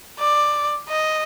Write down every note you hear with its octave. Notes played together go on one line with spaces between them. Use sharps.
D5
D#5